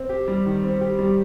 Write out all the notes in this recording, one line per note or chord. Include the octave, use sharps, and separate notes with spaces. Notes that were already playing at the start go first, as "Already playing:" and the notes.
Already playing: C4
G4
G3
D#3
C4
G4
G3